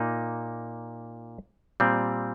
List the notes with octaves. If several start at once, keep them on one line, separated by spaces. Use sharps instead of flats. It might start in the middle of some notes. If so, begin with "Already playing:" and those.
Already playing: A#2 A#3 D#4
A#2 G3 C4